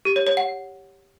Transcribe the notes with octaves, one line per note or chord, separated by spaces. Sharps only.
G4
C#5
C#5
F#5